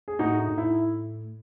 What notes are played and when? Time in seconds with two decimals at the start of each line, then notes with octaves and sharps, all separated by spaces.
0.08 G#4
0.19 A2 D#4 F#4
0.39 D#4
0.49 A2
0.58 E4